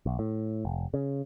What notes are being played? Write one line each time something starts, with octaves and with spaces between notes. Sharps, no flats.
B1
A2
F1
C#3